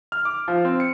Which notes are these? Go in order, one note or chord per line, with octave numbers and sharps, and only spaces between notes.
F6
D6
F3
C4
C#7